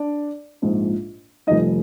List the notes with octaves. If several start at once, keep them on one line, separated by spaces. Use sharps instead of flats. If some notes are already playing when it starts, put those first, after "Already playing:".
Already playing: D4 D5
A#1 G#2 F3
F1 F2 D#3 G3 D#4 D#5